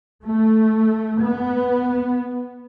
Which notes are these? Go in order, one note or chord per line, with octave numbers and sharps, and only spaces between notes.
A3
B3